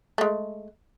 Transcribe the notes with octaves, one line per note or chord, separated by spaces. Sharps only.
G#3 A3